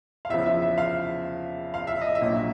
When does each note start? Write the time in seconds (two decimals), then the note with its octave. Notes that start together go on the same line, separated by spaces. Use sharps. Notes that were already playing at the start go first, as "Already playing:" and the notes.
0.25 F5
0.29 E2 C#3 F3 E5
0.46 E5
0.62 E5
0.78 F5
1.74 F5
1.87 E5
2.01 D#5
2.15 E5
2.21 A#1 A#2 F#3